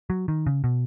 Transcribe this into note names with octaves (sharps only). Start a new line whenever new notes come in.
F#3
D#3
C#3
B2